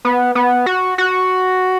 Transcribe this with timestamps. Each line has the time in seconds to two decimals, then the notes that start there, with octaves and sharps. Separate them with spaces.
0.05 B3
0.35 B3
0.66 F#4
0.98 F#4